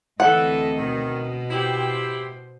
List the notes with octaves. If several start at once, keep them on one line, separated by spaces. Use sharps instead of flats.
D2 E3 C4 E4 A4 D#5 F#5
B2 D#3
E4 G4 C5